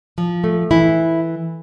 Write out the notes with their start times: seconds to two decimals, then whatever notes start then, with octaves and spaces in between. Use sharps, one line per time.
0.18 F3
0.44 A3
0.71 E3 E4